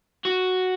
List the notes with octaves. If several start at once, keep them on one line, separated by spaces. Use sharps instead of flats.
F#4